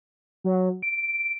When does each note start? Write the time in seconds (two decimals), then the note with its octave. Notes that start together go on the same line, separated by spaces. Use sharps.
0.44 F#3
0.82 D7